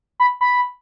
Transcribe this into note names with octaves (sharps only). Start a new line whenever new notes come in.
B5
B5